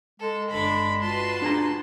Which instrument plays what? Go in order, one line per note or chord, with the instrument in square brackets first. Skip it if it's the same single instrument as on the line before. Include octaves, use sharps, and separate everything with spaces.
[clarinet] G#3 [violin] A4
[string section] G1 D4 [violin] B5
[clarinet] F4 [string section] F#4 B4 C6 [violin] A5
[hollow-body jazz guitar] D4 G#4 A#5